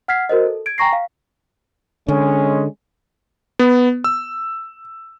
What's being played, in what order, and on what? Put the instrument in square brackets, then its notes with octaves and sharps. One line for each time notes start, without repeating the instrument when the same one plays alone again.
[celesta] F#5 F6 G#6 B6 C7
F#4 A#4 C5 D#5
A4
G#6 D7
G5 G#5 A#5 C#6 A#6 C7
F5
[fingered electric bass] D3 [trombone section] G#3 C#4
[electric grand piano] B3
E6